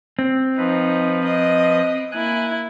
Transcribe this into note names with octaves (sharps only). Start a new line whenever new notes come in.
C4
F3 D#4 B4
D#5
A#3 E4 G#5 F#6